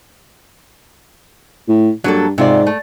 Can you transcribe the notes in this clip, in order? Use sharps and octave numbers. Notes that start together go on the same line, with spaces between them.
A2
G2 F#3 A#3 A4
G#2 C3 F4 D5
A3